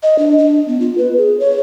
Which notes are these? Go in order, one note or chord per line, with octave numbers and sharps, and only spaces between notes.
D#5
D4
D4
B3
F4
B4
G#4
C#5